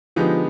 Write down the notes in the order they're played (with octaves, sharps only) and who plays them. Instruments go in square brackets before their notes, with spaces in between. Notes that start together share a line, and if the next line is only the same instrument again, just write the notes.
[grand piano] D3 G#3 B3 D#4 G4 [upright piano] F3